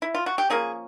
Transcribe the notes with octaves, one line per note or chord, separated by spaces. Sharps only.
E4
F4
F#4
G4
F3 A#3 C#4 G#4